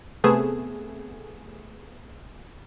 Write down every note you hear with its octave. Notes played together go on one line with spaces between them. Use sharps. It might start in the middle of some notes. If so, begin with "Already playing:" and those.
C3 A3 B3 G#4 E7